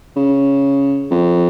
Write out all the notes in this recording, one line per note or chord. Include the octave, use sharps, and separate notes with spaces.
C#3
F2